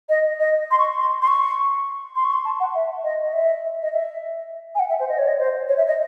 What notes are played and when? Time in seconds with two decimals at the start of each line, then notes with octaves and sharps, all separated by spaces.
0.09 D#5
0.40 D#5
0.71 C6
0.79 C#6
0.98 C6
1.22 C6
1.27 C#6
2.16 C6
2.24 C#6
2.33 C6
2.45 A5
2.60 F#5
2.75 E5
3.04 D#5
3.23 D#5
3.33 E5
3.82 D#5
3.92 E5
4.75 G#5
4.79 F#5
4.89 E5
5.00 C5
5.09 D#5
5.19 C#5
5.28 D#5
5.39 C5
5.68 C#5
5.77 E5
5.87 D#5